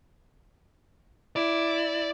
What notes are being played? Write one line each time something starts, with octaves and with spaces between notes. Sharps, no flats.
E4 D5